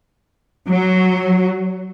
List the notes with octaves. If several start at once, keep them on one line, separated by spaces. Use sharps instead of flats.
F#3